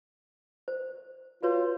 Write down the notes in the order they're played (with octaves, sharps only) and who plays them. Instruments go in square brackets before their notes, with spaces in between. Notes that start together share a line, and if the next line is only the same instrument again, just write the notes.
[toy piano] C5
[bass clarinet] F4 [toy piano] F#4 B4 C#5